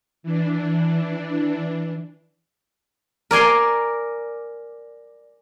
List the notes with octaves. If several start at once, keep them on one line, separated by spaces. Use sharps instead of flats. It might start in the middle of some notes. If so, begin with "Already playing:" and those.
E3 D4
A#4 D5 G#5 C6